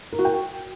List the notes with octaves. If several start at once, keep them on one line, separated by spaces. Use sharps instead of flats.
A#4
F#4
G5